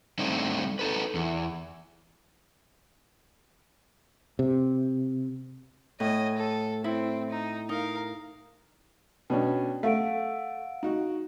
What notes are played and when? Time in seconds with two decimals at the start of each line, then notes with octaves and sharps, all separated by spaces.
0.19 G3 A3 C4 D4 D#4 C5
0.79 D#4 A4 B4
1.15 E2
4.39 C3
6.00 A2 D#5 G#5
6.37 A4
6.84 C4 E4
7.30 D#4
7.69 D#4 A#4 F5
9.30 B2 C#4 D4 G5
9.83 A3 F5 F#5 D7
10.83 D#4 F#4